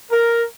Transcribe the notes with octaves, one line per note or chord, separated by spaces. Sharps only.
A#4